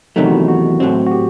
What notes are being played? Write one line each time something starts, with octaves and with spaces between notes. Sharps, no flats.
E2 C3 D#3 F#3 A3 D#4
F#4
E4
F#4
A2 F#3 C4
F#4
G4